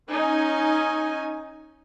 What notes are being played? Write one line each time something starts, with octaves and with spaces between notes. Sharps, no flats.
C#4 D#4 G#5